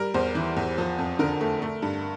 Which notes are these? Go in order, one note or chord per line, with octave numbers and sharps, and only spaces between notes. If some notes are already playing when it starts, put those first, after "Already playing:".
Already playing: G3 A#4
E2 C5
E3
E2
F3
F2
D3 A#4
A3
A3
G2